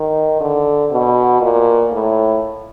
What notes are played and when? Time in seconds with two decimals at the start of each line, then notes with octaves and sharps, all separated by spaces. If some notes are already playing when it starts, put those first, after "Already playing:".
Already playing: D#3
0.41 D3
0.91 B2
1.42 A#2
1.92 A2